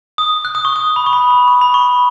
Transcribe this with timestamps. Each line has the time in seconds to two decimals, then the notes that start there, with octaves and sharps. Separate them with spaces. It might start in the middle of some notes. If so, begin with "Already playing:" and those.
0.18 D#6
0.45 F#6
0.55 D#6
0.65 C#6
0.76 D#6
0.96 B5
1.06 C#6
1.13 B5
1.31 B5
1.48 C#6
1.61 B5
1.74 C#6